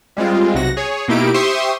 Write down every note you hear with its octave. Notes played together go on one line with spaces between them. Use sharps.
G3 G#3 C4 F4
B1 C3 F#4 A#6
G#4 C#5
B2 A#3 D#4 E4 G4 D7
G4 C5 E5 C6 C#6 D#6